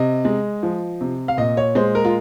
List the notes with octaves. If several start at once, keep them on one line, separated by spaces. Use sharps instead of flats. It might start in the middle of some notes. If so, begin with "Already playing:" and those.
Already playing: C3 D#5
G#3
F3
C3
F5
A#2 D#5
C#5
G#3 C5
A#4
F4